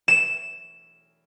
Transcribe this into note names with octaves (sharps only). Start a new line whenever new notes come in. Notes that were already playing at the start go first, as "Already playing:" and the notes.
E7